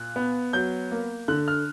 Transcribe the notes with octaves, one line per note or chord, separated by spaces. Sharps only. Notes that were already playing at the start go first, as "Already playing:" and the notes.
Already playing: A#2 F#6
B3
F#3 G6
A#3
D3 F#6
F6